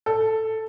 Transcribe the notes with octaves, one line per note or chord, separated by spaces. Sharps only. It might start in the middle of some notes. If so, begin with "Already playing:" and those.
A4